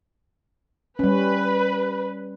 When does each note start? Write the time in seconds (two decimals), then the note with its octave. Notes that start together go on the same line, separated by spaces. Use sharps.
0.99 G3 C#4 B4